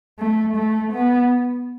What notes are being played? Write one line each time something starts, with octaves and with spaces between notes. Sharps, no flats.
A3
A3
B3